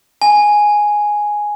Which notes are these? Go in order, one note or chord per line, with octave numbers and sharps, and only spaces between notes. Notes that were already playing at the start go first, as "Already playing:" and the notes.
G#5